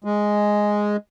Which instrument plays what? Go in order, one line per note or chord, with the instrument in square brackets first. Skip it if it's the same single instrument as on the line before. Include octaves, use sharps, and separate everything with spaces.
[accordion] G#3